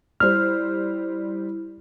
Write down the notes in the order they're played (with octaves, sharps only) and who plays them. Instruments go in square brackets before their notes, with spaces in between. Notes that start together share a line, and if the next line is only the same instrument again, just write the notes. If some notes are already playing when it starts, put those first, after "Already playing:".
[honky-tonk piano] G3 C5 [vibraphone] E4 [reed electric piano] F6